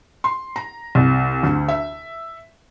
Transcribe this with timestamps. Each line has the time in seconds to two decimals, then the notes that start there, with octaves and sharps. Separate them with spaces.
0.24 C6
0.56 A#5
0.95 C2
1.43 D2
1.68 E5